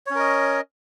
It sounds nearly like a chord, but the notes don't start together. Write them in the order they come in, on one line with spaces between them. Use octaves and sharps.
C#5 C#4 A#4 D#5